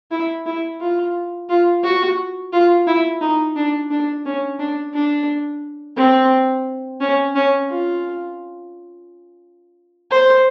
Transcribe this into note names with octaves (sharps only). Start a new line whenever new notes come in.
E4
E4
F4
F4
F#4
F4
E4
D#4
D4
D4
C#4
D4
D4
C4
C#4
C#4
F4
C5